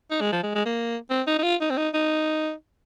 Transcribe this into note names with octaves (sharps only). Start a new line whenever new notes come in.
D#4
G#3
F3
G#3
G#3
A#3
C4
D#4
D#4
F4
D#4
C4
D#4
D#4